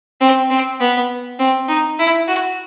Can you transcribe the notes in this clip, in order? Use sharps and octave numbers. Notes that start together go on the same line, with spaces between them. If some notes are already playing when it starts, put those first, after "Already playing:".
C4
C4
B3
C4
D#4
E4
F#4